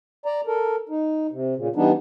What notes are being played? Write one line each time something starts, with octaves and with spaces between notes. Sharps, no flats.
D5 A#5
A4 A#4
D#4
C3
A#2 C#3
E3 G3 B3 D4 D#4